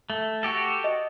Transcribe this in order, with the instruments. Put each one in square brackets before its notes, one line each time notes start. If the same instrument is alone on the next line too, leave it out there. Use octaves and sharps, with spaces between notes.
[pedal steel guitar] A3
F#4 G4 A4
[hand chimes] D#5